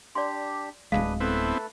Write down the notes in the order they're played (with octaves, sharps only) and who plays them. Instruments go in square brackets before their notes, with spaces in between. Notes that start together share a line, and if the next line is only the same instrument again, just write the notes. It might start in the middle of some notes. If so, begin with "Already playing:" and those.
[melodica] D4 G4 [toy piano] D5 C6
[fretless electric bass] D1 D#2 G#3 [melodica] D4 B4 D#6 [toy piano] F5
[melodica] A3 A4 B4 [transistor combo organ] B3 C4 E4